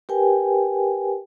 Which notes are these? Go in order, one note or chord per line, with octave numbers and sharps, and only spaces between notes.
G4 A#4 B4 G5 G#5